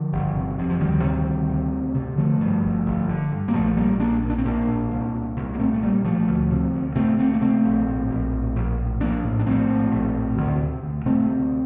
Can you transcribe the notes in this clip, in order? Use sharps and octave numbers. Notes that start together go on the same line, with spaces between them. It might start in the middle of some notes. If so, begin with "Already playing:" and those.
Already playing: D3 F3
G1
C3
F2
F3
D2 D#3 G3
C3
D2
C3
D2
C3
D3 F3 A3
G2
G1
G1
D3
G2
A#3
A#1 F3 A3
A#2 G3 A#3
A#1 A#3 D4
A#2
D4
C4
A#1 A#3 D4
A#2
C2
A#2
C2
A#3
A#2 A3 C4
A3
C2 G3 A#3
A#2 F3 A3
D2
C3
D2
C3 A3 C4
D2 A3 C4
A#3
C3 A3 C4
A#1
A2
A#1
A2
A#1
A2
A#1 A#3 D4
A2
D4
A#1 A3 C4
A2
A#1
A2
D2
C3
D2
C3 A3 C4
D2